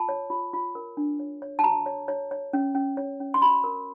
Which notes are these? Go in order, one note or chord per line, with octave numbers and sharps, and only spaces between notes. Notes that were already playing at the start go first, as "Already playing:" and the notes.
Already playing: F4 A5
C#5
F4
F4
A#4
D4
C#5
C#5
A5
F#4 A#5
C#5
C#5
C#5
C#4
C#4
C#5
C#4
C6
F#4 B5
A#4